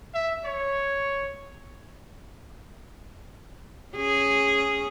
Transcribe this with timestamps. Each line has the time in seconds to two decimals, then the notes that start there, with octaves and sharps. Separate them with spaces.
0.14 E5
0.44 C#5
3.96 C#4 G#4